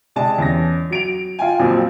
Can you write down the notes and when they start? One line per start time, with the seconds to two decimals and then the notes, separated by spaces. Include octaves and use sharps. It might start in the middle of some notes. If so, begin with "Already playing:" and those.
0.16 C3 G#3 D5 A5
0.38 E2 C#4 A#6
0.90 F#3 D7 F7
1.39 F4 G5 G#5
1.59 F2 A#2 F3 F#3 C4